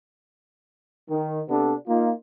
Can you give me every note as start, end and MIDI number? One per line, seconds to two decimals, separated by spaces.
1.09 1.41 51
1.49 1.73 48
1.49 1.73 59
1.49 1.73 62
1.49 1.73 69
1.88 2.11 58
1.88 2.11 63
1.88 2.11 65